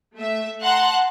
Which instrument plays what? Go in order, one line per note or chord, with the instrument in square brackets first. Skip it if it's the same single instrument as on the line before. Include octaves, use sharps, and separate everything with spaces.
[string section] A3 E5
F#5 A5 A#5 C6 F#6